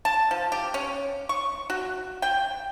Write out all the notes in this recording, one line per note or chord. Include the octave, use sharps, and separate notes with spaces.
A5
F3
G4
C#4
C#6
F#4
G5